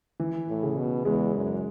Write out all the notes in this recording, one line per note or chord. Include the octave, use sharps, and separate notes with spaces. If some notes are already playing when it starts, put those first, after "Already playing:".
E3
A2
C#3
B2
E2 G#3
F#2